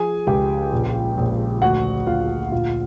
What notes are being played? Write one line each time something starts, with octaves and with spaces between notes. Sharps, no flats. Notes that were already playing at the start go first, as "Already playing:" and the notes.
Already playing: F3 G#4 G#5
C#2 G4 G5
A#1
A#1
D2 F#4 F#5
D2 F4 F5
A#1 F4 F5